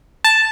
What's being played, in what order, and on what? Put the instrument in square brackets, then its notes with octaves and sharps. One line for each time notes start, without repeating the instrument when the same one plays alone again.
[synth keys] A5